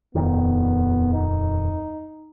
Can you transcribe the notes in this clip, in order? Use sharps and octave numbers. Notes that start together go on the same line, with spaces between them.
D#1 F2 D#3 B3
D#4